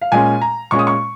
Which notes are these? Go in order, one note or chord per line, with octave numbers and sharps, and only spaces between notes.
F5
A#2 G#3 C#4 G#5
A#5
A#2 G#3 C#4 C#6
D#6
C#6